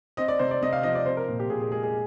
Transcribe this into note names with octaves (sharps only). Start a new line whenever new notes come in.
C4 D#5
D5
C3 C5
D5
C3 D#5
F5
F3 D#5
D5
C4 C5
A#4
A#2
G4
A#2 G#4
G#4
G#3 G#4
G#4